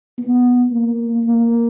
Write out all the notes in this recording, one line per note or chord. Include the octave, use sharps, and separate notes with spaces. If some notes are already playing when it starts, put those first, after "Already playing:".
B3
A#3
A#3